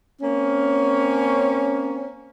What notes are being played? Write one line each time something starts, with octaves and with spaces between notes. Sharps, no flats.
A#3 C4 C#4